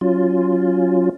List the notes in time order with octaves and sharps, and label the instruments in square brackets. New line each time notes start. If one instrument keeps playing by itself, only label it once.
[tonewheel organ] F#3 C#4 F4